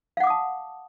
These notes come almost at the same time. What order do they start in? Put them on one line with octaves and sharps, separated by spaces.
F5 F#5 D6 D#6 A5